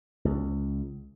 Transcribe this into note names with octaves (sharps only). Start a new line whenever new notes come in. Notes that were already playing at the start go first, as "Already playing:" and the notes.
C#2